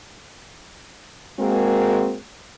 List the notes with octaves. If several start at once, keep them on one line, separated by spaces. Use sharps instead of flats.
G#3 A#3 C4 F#4 G#4 A#4